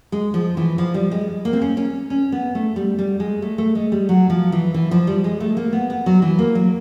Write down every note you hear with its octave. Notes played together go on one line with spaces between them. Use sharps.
G#3
F3
E3
F3
G3
G#3
A#3
C4
C#4
C#4
C#4
B3
A3
G3
G3
G#3
A3
A3
G#3
G3
F#3
F3
E3
E3
F3
G3
G#3
A3
A#3
B3
B3
F#3
E3
A#3
F#3